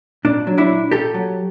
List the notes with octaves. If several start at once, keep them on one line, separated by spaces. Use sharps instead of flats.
A#2 D4
F#3
D4 E4
A#2
A#2 G4 A4
F#3